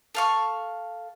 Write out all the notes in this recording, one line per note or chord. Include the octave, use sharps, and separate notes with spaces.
A4 F5 C#6